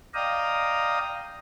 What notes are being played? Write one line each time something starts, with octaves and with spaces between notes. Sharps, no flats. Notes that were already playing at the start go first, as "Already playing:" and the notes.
D5 D#5 F5 G5 A#5 D#6